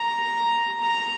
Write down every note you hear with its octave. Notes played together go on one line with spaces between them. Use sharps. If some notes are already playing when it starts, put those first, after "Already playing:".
Already playing: A#5
A#5